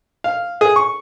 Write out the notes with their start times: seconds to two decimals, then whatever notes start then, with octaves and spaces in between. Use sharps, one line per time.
0.24 F5
0.61 G#4
0.76 C#6